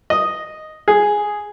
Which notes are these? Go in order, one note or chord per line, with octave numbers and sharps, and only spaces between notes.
D#5
G#4